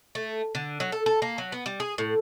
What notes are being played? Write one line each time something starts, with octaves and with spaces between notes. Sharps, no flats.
A3
D3
F#3
A4
A4
A#3
F#3
B3
G3
G#4
A2